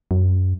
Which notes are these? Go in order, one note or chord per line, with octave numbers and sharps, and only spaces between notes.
F#2